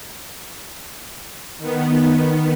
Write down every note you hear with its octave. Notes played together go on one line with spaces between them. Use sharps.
D#3 B3